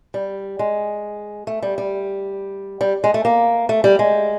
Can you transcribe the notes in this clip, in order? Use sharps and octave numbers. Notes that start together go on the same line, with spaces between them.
G3
G#3
A3
G3
G3
G3
G#3
A3
A#3
A3
G3
G#3